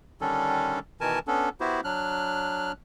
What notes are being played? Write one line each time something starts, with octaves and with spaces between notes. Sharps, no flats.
D3 D#3 G3 C#4 D4 A4
B2 D#3 E3 A#4 G#5 A5
B3 C#4 D4 A4
B3 E4 F#4 G4 C5
F#3 D4 F6 F#6